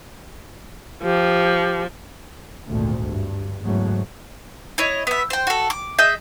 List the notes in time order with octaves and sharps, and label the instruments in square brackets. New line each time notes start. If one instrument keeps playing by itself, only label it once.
[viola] F3 [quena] G4
[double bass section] G#1 D2 A#2 A3
G2
E2 G#2 C#3 F#3 A3
[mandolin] E4 C#5 D#5
B3 E5
C5 G5
F#4 A4
D6
G#4 D#5 E5 G6